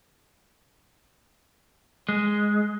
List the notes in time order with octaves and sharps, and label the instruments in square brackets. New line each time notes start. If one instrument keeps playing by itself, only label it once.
[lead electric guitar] G#3